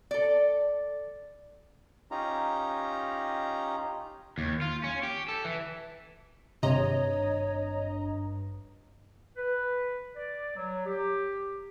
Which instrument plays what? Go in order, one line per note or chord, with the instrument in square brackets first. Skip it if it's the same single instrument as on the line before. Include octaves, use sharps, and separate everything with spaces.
[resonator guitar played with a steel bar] A4 D5
[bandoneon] C#4 D#4 F4 G4 A#5
[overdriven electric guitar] D#2
F4
C#4
G4
A4
E3
[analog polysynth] G#1 D#5 A#5 [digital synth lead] G2 [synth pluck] C3 [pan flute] C#5
[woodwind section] B4
D5
F#3
G4